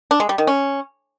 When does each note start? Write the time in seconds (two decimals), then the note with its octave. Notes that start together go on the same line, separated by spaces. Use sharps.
0.11 D4
0.20 G#3
0.29 G3
0.38 D#3
0.47 C#4